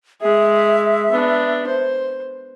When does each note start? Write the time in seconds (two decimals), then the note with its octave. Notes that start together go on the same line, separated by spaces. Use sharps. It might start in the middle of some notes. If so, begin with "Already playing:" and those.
0.21 G#3 G#4 E5
1.11 B3 D4
1.67 C5